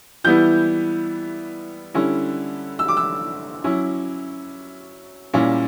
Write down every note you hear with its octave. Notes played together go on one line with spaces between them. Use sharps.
E3 G3 B3 E4 G6
D3 G3 C#4 E4
E6
D6
E6
F#3 C#4 E4
A#2 G3 A#3 C#4 E4